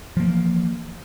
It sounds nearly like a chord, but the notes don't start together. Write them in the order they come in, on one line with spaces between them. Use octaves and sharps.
F3 A#3 E3